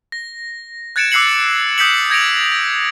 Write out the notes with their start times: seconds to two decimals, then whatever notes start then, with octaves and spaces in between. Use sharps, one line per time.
0.12 A#6
0.96 F#6 G#6 A6 C#7 D7 E7
1.12 D6 E6 F#6 C7 C#7 F#7
1.78 D#6 G6 B6 C#7 F#7
2.10 G6 G#6 A#6 C#7 D7 F7
2.52 A#6